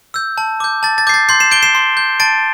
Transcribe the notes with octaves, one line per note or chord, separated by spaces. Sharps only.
E6 G6
A5
D6 G6
A5 A6
A6
D6 G6 C7
A6
C6 G6 C7
C7 E7
G6 D7 G7
C7 E7
C6
G6
A5 A6 D7